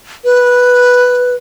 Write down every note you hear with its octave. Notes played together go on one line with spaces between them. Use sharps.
B4